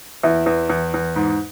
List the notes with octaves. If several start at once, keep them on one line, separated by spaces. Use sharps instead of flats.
E2 E4
E2
E2
E2
G#2